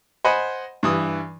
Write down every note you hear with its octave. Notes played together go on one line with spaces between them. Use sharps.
C5 D#5 F#5 G#5 B5
G2 E3 D#6